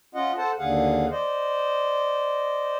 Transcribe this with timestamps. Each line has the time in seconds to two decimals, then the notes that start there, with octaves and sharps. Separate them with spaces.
0.15 C#4 F4 D#5 F#5
0.38 A4 C5 F#5 A5
0.59 D#2 D3 G#4 F5 F#5
1.10 C5 D5 D#5